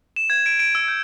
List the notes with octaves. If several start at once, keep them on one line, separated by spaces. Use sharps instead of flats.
E7
G#6
D7
D7
E6
G6